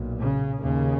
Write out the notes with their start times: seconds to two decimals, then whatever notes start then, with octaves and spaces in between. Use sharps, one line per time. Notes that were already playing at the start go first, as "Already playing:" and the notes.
Already playing: B1 A#2
0.19 C#3
0.60 D#2 C#3